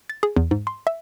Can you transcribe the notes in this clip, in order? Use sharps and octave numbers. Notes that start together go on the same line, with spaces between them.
A6
G#4
E2
G#2
C6
E5